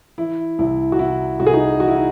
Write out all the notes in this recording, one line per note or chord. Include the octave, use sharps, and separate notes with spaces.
E3 E4
C2 E4
F#4
C3 E4
C2 F#4
G#4
D#4 F#4
E3 F#4
E4
D#4